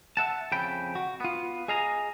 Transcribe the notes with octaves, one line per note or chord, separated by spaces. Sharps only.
E5 F#5 A5
F2 C#3 G5 B5
F#4
B3 F4
G#4 D#5 F5 G#5 A#5